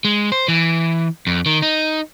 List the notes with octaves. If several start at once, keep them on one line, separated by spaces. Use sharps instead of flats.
G#3
C5
E3
F2
D#3
D#4